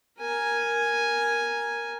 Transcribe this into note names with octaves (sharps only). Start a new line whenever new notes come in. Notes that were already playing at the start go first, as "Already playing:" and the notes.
A#4 G#5